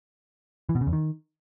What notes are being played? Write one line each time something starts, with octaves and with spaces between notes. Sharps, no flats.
E3
B2
C#3
E2
D#3